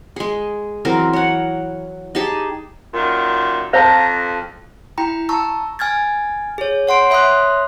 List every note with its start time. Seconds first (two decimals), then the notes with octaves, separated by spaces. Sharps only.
0.16 G#3 G#4
0.85 E3 F#3 C4 A#4
1.13 C#5 F#5
2.15 D#4 G4 G#4 A5
2.94 F#2 A#2 D#3
3.73 F2 C5 C#5 F5 A5 A#5
4.98 E4 G5 A#5 B5
5.29 A5 A#5 C#6 E6
5.79 G#5 F6 G#6 A6
6.58 G#4 C#5
6.87 C#5 F#5 C6 D7
7.10 C#5 E5 B5 C6 D#6 F#6